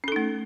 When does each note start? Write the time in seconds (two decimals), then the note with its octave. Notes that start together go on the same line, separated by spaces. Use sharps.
0.04 C#4
0.08 A4
0.12 D#4
0.16 A3